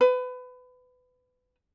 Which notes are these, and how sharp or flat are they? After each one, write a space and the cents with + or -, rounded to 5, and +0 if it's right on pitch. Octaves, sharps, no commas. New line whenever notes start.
B4 +25